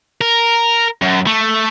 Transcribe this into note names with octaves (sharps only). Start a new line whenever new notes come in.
A#4
F#2
A3